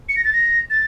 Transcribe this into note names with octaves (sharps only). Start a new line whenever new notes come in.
C#7
A#6
A6
A#6
A6